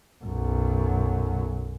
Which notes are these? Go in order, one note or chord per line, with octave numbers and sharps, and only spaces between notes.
B1 F#2